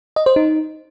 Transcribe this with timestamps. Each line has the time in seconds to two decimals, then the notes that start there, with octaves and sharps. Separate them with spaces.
0.16 D#5
0.26 C5
0.36 D#4